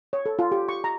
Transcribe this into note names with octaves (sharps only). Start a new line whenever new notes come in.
C#5
A4
F4
G4
C#6
A#5